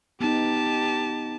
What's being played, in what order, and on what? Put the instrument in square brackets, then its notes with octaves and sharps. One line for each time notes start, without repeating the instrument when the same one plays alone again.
[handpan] B3 D#4 [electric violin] G4 A5